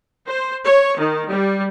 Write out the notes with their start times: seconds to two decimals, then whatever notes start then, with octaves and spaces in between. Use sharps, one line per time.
0.24 C5
0.62 C#5
0.95 D#3
1.29 G3